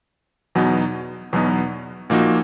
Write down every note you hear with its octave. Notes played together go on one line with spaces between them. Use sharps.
E2 B2 F#3 B3 D#4
E2 B2 F#3 B3 D#4
A#2 F3 A#3 D#4 F#4